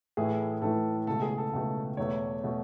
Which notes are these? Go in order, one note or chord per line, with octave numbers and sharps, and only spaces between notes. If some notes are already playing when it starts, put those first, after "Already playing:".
A2 E3 A3 E4 G#4
A2 E3 A3 E4 A4
C#2 B2 A3 A4
G#4
A4
C#2 B2 A3
E2 B2 A3 C#5
B2 A3